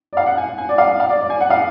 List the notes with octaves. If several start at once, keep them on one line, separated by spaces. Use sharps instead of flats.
D5
F5
F#5
G#5
G#5
D5
F5
F5
D5
D5
G#5
F#5
F5